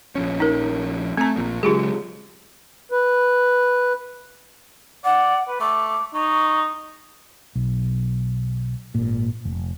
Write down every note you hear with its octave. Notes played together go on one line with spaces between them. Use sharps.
A#1 F3 C#4
D#4 A#4
A3 C4 A#5
A#1 F3 A#3
C#3 F#3 G#3 F4 G4 G#4
B4
D5 F#5
B4
A3 D6
D#4 C#6
B1
G#1 A#2
F1